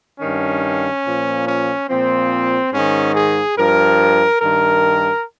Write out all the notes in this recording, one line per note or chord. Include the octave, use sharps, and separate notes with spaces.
G2 D#3 C#4
A#2 F3
C#4
A#2 F3 C4
G#2 D#3 C#4
G#4
G2 F3 A#4
G2 D#3 A#4